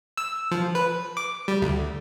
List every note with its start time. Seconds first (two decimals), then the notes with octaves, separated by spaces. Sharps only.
0.17 E6
0.51 F3
0.75 B4
1.17 D6
1.48 G3
1.62 D2